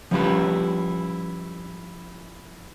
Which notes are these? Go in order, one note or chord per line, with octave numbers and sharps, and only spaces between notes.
F3 G3 C#4 E4 G4 B4